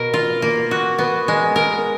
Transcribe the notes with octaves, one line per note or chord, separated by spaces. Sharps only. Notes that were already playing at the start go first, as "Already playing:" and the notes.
Already playing: B2 A#3 A#4
F4
A#3
F#4
B3
G#3
A#4